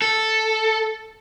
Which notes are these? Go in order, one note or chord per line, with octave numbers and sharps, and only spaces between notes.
A4